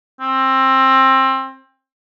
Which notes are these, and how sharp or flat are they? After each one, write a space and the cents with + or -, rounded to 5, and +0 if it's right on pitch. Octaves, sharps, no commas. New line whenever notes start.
C4 +20